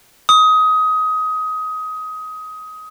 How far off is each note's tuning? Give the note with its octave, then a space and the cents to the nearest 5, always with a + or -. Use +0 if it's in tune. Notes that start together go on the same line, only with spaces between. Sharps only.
D#6 +20